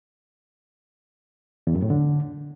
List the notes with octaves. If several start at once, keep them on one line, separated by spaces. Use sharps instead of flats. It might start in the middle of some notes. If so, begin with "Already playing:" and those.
E2
F#2
A2
D3